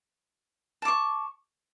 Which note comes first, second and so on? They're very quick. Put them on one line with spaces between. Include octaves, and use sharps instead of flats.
A5 D6 C#6